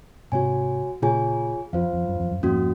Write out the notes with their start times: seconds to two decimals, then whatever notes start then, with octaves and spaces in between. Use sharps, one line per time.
0.32 G#2 C3 F#4 C#5 G#5
1.02 A#2 C#3 F4 G#4 C#5 G#5
1.73 F2 F4 C5 F5
1.93 F2
2.08 F#2
2.20 F2
2.31 F#2
2.43 F2 G#2 A#3 C#4 F#4